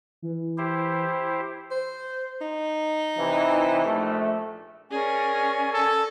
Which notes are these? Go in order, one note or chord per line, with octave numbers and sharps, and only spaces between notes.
E3
E4 G4 C5
C5
D#4
C3 E3
A#1 A3
C#4 G#4 A#4 D5 G#5
A4